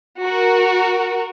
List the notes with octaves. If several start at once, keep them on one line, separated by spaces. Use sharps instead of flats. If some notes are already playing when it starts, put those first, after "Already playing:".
F#4 A#4